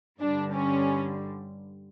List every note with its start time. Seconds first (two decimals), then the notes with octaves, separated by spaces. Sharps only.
0.20 G2 D3 G3 D4
0.53 C#4